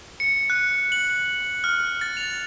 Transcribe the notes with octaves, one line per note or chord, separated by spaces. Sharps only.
C#7
F#6
F#7
F6
A6
F7